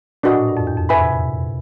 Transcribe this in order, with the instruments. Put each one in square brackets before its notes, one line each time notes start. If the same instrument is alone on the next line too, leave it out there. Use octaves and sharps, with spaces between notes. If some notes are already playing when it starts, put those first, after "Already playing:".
[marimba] A#2 [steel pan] D4 F#4 B4 D#5
[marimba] A2
G2
F2
E2
F2
[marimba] A2 [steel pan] B4 E5 G#5 B5
[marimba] C3
B2
A#2